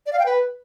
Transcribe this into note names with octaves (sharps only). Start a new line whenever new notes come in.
D5
F5
G5
B4